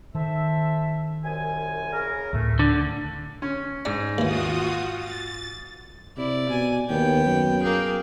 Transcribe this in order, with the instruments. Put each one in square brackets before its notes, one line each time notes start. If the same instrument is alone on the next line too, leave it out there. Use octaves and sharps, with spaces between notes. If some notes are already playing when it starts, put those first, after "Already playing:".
[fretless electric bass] D#3 [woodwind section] A4 C5 E5
[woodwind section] C2 F#2 G#5
C#3 A#4
[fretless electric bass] D2 A2 [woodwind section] A3
[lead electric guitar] D3
[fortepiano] C#4
[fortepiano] G#2 [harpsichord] D4
[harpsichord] D#2 E3 [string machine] F4 F#4 D#6
[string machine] A6
[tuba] C3 [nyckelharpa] E4 [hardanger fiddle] D5
[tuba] B2 [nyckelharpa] G#5
[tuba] D#2 [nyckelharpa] B3 [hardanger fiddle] G5
[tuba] F#2
[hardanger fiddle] A#3 G#4 [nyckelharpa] G5